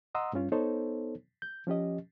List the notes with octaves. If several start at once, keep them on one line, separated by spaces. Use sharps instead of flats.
D#5 F#5 A#5 C6 D#6 E6
G2 G3 C#4 F4
B3 D#4 A4 C5 C#5
G6
F3 C#4 G4 D#5